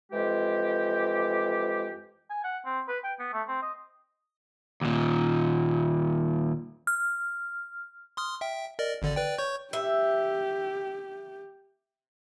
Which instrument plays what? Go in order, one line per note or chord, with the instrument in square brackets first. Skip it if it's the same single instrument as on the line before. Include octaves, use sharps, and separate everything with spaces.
[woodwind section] F2 E3 G#3 G4
[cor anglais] G#5
F#5
C4
B4
G5
B3
A3
C4
D#5
[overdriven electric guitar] D#2 A#2
[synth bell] F6
[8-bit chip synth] C6 D#6 F6
E5 G5
A#4 D5 D#5
G#1 D3 D5
B4 D5 G5
C#5 C#6 G6
[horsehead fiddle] G4 [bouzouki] E5